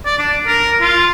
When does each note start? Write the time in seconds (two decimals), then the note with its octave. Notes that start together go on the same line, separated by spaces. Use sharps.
0.05 D5
0.19 D4
0.47 A#4
0.81 F4